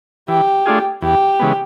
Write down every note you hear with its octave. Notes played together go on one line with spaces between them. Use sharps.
E3 G4
A3 D4 F4 G#4
E2 G4
C#3 E3 G#3 B3